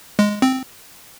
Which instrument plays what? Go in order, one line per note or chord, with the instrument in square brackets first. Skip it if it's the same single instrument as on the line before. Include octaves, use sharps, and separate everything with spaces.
[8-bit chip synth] G#3
C4